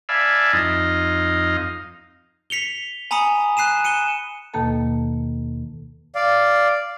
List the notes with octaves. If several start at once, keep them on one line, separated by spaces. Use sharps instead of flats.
D5 E5 F5 G#5 A5 B5
F2 D#4 D#5 F5
B6 C#7 F7 G7
G#5 A#5 B5 D#6 C#7
F#6 C7 D#7 E7
C#7 D#7 E7 G7
D#2 B2 D#3 A#3 A4 A5
D5 F5